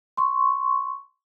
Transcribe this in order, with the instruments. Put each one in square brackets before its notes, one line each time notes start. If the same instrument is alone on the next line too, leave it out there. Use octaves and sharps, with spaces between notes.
[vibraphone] C6 C#6